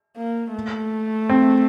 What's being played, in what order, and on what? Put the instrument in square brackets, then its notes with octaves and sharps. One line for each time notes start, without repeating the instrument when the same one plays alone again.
[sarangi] A#3
A3
[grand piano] C4